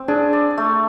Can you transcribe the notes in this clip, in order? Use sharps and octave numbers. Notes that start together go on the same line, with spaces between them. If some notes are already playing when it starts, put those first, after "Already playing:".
Already playing: C4
D4 G#4
D5
A3